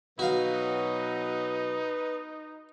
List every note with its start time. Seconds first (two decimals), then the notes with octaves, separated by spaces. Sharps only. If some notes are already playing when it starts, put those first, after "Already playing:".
0.19 B2 F#3 D#4 F#4 B4 F5